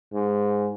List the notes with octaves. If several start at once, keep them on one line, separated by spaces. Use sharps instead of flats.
G#2